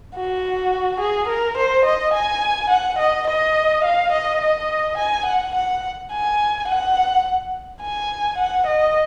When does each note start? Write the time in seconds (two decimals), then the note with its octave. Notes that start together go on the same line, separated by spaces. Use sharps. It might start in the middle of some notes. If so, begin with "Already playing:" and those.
0.15 F#4
1.00 G#4
1.28 A#4
1.57 C5
1.85 D#5
2.14 G#5
2.70 F#5
2.99 D#5
3.27 D#5
3.84 F5
4.12 D#5
4.41 D#5
4.98 G#5
5.26 F#5
5.55 F#5
6.11 G#5
6.68 F#5
7.82 G#5
8.38 F#5
8.67 D#5